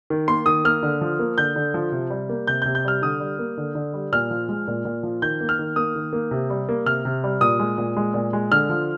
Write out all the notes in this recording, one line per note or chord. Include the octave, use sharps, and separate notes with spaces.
D#3
A#3 C6
D#3 D#6
A#3 F6
D3
F3
A#3
D3 G6
D3
F3
C3
G3
A#3
C3 G6
C3 G6
G6
G3 F6
D3 D#6
G3
A#3
D3
D3
G3
A#2 F6
F3
G#3
A#2
A#2
F3
D#3 G6
A#3
F6
D#3
A#3 D#6
D#3
A#3
C3
G3
A#3
C3 F6
C3
G3
A#2 D#6
G#3
A#2
G#3
A#2
G#3
D3 F6
F3